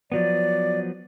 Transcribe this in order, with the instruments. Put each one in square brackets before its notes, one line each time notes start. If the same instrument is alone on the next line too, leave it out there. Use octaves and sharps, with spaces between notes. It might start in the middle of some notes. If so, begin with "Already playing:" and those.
[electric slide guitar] F3 F#3 B3 [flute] D5